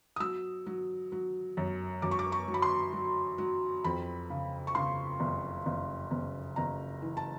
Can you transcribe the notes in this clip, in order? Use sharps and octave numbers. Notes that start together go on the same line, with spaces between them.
D#6
F#3 E6
F#3
F#3
F#2
F#2 D6
C#6
D6
C#6
F#3
B5
C6
F#3
F#3
F2 B5
C#3
C#6
C#3 C6
F#1
F#1
F#1
F#1 A#5
E3
A5